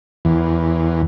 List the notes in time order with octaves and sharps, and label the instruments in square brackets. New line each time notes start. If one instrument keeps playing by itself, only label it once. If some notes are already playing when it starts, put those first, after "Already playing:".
[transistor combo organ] E2